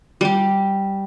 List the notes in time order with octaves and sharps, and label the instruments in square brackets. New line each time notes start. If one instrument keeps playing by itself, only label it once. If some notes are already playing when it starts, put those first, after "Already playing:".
[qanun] G3 G4